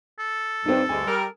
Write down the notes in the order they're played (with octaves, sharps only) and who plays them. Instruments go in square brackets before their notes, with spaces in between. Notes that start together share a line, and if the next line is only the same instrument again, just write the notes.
[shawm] A4
[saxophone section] G2 [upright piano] C4 D#4
[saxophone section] D2 G2 G#3 [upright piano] G#5
[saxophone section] G3 A#4